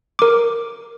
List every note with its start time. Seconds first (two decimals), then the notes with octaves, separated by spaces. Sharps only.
0.19 A#4 D6